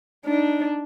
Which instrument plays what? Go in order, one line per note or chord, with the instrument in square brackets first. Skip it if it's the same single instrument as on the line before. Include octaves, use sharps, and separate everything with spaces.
[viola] D4 [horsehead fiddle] D#4